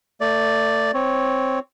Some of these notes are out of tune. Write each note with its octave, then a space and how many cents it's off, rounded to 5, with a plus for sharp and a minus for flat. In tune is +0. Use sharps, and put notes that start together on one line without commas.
A3 +30 D5 +0
C4 +0 C#5 +0